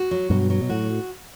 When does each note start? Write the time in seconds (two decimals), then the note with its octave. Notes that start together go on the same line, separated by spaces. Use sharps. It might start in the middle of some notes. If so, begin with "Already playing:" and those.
Already playing: F#4
0.11 F#3
0.30 G2 B2 F#3
0.50 F#3
0.61 B2
0.69 A2 F#4